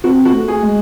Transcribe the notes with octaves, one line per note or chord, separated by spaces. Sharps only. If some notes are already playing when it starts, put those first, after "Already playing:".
C4 F#4
F#4
A3
G#4
G#3